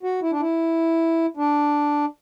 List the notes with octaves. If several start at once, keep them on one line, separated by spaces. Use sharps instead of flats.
F#4
E4
D4
E4
D4